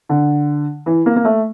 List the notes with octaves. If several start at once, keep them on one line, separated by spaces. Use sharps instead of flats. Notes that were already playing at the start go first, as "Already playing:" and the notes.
D3
E3
A#3
A#3
A3